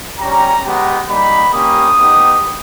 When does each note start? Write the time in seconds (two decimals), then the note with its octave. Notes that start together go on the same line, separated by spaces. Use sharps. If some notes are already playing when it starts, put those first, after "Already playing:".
0.19 G3 C#4 G4 A#5
0.64 G#3 B3 G4
1.08 G3 A#3 D#4 G4 B5
1.53 A#3 C#4 G4 D#6
1.99 B3 D#4 G4